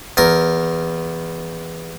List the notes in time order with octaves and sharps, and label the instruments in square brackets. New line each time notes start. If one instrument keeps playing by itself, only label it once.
[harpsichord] E2 A#4